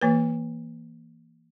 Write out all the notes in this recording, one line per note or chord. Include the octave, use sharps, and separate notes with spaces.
E3 A#3 B4